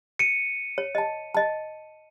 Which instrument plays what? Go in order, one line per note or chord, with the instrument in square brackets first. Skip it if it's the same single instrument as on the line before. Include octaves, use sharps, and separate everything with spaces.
[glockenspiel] C#7 D#7
[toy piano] C#5
D#5 A5
D#5 A5